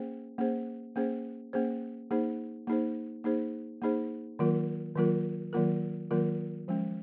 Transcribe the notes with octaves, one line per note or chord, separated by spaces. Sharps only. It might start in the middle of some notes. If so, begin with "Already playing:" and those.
Already playing: A#3 C#4 G#4 C5
A#3 C#4 G#4 C5
A#3 C#4 G#4 C5
A#3 C#4 G#4 C5
A#3 D#4 G#4 C5
A#3 D#4 G#4 C5
A#3 D#4 G#4 C5
A#3 D#4 G#4 C5
D#3 F#3 A#3 F4 A#4
D#3 F#3 A#3 F4 A#4
D#3 F#3 A#3 F4 A#4
D#3 F#3 A#3 F4 A#4
F3 G#3 C#4